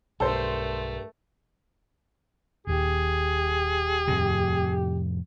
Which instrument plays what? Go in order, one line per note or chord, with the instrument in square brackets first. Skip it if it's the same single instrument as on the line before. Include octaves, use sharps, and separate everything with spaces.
[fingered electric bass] B1 [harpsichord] G2 [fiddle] A3 A#4 [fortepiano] A4 C5
[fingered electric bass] D#1 D#2 [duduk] G4 [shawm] G#4
[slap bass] F2 A2 C3